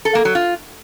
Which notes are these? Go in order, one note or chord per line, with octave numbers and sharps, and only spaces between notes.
A4
A#3
F#3
F4